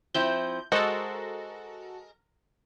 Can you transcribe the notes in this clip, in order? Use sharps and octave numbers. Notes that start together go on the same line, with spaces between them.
F3 C4 E4 G6
G#3 F#4 A4 A#4 C5 D#5